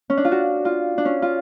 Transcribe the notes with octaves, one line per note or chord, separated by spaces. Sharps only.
C#4
D4
F4
F#4
F4
D4
C#4
F4